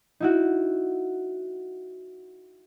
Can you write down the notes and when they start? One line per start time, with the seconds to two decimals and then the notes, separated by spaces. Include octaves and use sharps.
0.20 D#4 E4 F#4